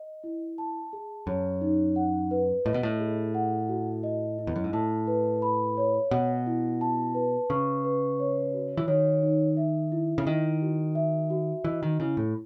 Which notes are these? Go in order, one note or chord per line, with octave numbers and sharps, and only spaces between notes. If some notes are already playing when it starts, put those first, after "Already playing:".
Already playing: D#5
E4
A5
G#4
F#2 C#5
D#4
F#5
B4
A2 D#5
B2
A2
G#4
F#5
F#4
D#5
E4
E2
F#2
G#2
A2 A5
B4
B5
C#5
B2 F#5
E4
A5
B4
C#3 C#6
B4
C#5
F#4
E3
D#3 C#5
D#4
E5
E4
C#3
D#3 D#5
F#4
E5
F#4
E3 D#5
D#3
C#3 E4
A2